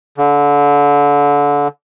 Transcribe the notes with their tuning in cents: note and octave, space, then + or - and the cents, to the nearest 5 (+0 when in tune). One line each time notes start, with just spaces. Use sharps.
D3 -25